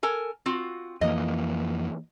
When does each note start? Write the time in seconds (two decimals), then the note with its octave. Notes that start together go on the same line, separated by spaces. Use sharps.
0.03 A4 A#4 G#5
0.46 C4 F4 F#4
1.01 F2 E3 A#3 D#5